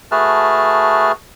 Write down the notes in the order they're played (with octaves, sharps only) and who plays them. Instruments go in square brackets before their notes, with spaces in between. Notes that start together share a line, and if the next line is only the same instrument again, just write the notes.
[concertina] A3 F#4 G#4 B4 A5 F6